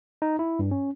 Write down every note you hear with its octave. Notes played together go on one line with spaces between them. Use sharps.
D#4
E4
G2
C#4